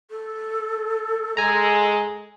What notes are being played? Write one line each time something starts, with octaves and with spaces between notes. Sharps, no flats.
A4
G#3 G#5 A#5